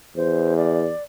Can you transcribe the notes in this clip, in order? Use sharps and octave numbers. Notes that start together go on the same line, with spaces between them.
E2 C5
D5